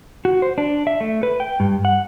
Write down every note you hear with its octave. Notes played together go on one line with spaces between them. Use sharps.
F#4
C5
D4
E5
A3
B4
G5
G2
F#5